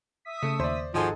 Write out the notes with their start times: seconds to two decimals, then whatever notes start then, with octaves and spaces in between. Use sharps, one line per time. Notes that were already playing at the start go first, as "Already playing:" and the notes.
0.25 E5 D#6 B6
0.43 C#3 A3
0.60 D#2 C5 D5
0.94 G#1 F3 D#4 F#4 G#4 A4 G#5 C6